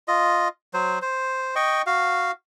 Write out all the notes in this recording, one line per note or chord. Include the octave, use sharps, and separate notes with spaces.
F4 D#5
F#3 C5
C5
D#5 G5 C#6
F#4 F5